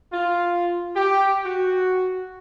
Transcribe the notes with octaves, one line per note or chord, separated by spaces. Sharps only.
F4
G4
F#4